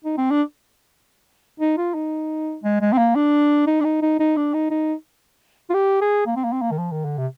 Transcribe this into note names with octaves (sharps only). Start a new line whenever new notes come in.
D#4
C4
D4
D#4
F4
D#4
G#3
G#3
C4
A#3
D4
D#4
D4
D#4
D#4
D#4
D4
D#4
D#4
F4
G4
G#4
A#3
C4
A#3
C4
A#3
D#3
F3
D#3
D3
C3